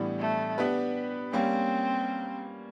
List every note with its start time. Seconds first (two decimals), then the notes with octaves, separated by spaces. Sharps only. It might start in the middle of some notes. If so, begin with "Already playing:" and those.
Already playing: A2 E3 G3 B3 D4
0.20 A3
0.58 B3 D4 G4 B4
1.33 G3 A#3 C4 C#4